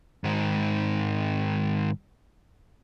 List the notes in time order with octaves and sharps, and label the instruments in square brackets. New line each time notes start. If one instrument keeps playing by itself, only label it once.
[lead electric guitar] G#2 D#3